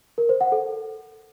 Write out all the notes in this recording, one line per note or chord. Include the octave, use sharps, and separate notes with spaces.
A#4
C5
F#5
A4